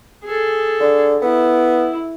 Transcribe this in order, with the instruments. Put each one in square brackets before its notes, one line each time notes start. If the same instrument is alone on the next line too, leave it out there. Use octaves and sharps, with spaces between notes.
[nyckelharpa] G#4 A4
[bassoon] D3
[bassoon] B3 [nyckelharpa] E4